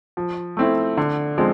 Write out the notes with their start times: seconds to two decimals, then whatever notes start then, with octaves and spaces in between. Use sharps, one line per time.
0.17 F3
0.57 A3 C4 E4
0.97 D3
1.38 F3 G#3 C4